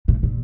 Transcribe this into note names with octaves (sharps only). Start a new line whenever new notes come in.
A#2
A#2